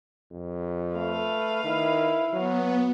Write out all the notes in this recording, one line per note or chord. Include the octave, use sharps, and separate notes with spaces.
F2
A3 B4 F5
D#3 E4
F#3 B3